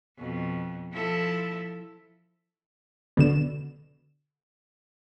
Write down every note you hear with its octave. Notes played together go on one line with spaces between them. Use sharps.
F2 B2
F3 E4 A4
B2 D3 E7